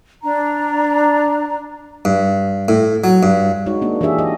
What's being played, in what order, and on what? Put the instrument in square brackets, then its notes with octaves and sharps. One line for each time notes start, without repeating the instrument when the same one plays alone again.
[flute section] D4 A#5
[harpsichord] G2
A2
F#3
G2
[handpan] G#3 D#4 F#4 C#5
A#3 D4
E3 D4 G4 G#4 E5
D#5